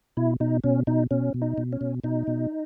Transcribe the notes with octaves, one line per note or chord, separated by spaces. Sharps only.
B2 E4
B2 D#4
B2 C#4
B2 D#4
B2 C#4
B2
D#4
B2
C#4
B2
B2 D#4
B2